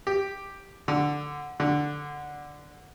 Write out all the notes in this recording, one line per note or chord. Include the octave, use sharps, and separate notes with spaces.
G4
D3
D3